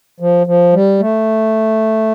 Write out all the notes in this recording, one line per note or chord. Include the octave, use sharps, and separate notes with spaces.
F3
F3
G3
A3